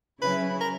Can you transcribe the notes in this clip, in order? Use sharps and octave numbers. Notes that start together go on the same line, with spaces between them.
C#3 F#3 C#4 E4 B4
A#4